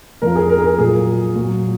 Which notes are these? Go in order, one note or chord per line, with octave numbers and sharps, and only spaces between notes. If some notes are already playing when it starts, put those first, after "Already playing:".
F2 F3 A#4
G#4
A#4
G#4
A#4
A#2 F#3 G#4
A#2 F#3